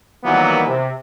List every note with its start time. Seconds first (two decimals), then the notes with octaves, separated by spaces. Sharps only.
0.24 D#3 E3 F#3 G3 A#3 B3
0.67 C3